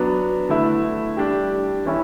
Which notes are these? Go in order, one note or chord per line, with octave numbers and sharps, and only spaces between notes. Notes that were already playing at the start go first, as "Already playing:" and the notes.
Already playing: F#3 B3 D4
D3 A3 E4
G3 D4 G4
E3 G3 C#4 E4